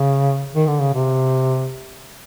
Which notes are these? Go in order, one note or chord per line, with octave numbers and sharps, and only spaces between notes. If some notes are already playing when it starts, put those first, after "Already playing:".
Already playing: C#3
D#3
D3
C#3
C3